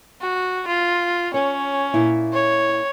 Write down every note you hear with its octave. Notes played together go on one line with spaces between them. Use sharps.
F#4
F4
C#4 C#5
A#2 E4
C#5